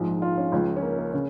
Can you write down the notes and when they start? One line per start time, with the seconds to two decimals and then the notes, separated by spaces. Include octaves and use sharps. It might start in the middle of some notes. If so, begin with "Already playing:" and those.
Already playing: A#1 G#2 F3
0.22 F4
0.38 C#4
0.52 C#2 C#3 F3
0.76 C#4
0.82 A#3
0.98 A#3
1.13 C#3 C#4